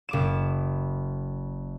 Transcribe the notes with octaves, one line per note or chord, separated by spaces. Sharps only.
F#1 D6 E7